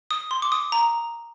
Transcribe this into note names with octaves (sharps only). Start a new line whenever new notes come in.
D#6
C6
D6
D#6
A#5